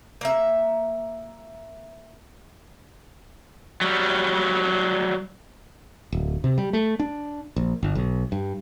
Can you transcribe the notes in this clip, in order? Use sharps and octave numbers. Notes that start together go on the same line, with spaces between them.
A#3 E5
F#3 G3
D1
C3
G3
A3
D4
A#1
G1
B1
G2